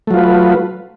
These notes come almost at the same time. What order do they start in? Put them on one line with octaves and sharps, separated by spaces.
A3 F#3 F4 B4